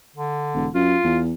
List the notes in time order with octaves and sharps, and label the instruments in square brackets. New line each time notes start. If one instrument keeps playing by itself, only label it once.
[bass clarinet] D3
[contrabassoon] E1
[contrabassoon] F#2 [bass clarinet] F4
[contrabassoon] E2